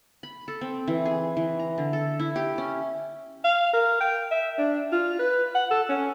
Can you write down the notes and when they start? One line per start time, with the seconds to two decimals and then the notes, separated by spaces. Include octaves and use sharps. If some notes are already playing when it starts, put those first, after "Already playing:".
0.23 B5
0.48 A4
0.61 C4
0.88 E3
1.05 G#4
1.37 E3
1.59 A#5
1.78 D3
1.93 A4
2.19 E4
2.36 G4
2.58 C#4
3.44 F5
3.73 A#4
4.00 G5
4.31 E5
4.58 D4
4.92 F4
5.19 B4
5.55 F#5
5.71 A4
5.89 C#4